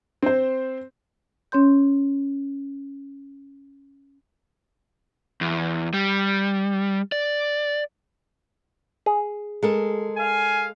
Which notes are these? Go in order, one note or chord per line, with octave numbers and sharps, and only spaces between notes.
C4 C5
C#4 C#5 C6 G6
E2
G3
D5
G#4
G#3 A4 A#4
F5 G#5